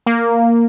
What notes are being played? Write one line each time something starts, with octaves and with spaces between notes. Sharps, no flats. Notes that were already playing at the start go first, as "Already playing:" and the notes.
A#3